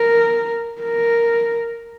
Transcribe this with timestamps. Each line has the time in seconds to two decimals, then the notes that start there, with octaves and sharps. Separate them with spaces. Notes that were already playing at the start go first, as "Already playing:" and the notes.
Already playing: A#4
0.82 A#4